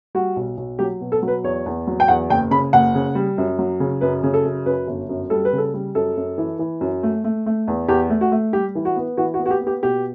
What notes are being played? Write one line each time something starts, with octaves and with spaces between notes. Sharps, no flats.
G3 F#4
B1
B1
F#3 G4
B2
A4
F#3
B4
E2 C#5
E2
F#3
G5
E2 F#5
F#1 G5
C#3 B5
F#1 F#5
C#3
G3
F#2
F#3
C#3
F#2 B4
C#3
A4
F#2
F#2 B4
G1
F#2
G3 A4
B4
C#3
A4
G3
F#2 A4
F#2
E3
E3
F#2
A3
A3
A3
E2
E2 G4
A3
F#4
A3
G3 G4
E3
F#4
B3
E3 F#4
F#4
B3
F#4
G4
B3
G4
B2 G4